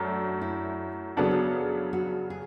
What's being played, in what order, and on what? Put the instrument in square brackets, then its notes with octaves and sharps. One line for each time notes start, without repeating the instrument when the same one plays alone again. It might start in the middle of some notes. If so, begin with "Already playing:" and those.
Already playing: [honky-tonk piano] F#2 A3 D4 A4 [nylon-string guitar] F#4
[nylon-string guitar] E4
[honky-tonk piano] C#3 F#3 B3 D4 A4 [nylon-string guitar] F#4
[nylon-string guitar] E4
F#4
F#4
G#4